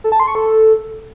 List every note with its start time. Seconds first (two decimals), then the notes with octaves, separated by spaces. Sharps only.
0.04 A4
0.12 A5
0.20 C6
0.27 C#6
0.35 A4